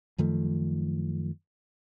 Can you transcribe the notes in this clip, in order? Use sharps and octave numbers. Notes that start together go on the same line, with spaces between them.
F#2 D#3 F3 A3